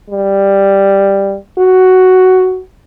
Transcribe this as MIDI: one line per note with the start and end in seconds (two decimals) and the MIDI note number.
0.10 1.36 55
1.59 2.60 66